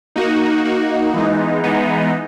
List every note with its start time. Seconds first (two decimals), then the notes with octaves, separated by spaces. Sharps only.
0.16 A#3 D#4 F#4
0.65 A#3 D#4 F#4
1.14 E3 G#3 B3 D#4
1.64 E3 G#3 B3 D#4